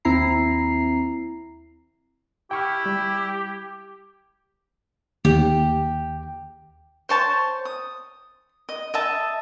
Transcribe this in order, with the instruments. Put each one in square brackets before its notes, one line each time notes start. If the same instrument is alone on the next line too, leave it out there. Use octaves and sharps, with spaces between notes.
[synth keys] D#2 C4 E4 A#5 C7
[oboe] E4 [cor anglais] G4 [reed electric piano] G5 C#6 F6
[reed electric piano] G3
[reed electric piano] D#2 [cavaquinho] G4
[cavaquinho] C5 C#5 A5 C#6
D#6
D#5
D#5 E5 A5